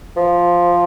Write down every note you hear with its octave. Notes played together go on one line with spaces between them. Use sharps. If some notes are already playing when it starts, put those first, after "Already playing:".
F3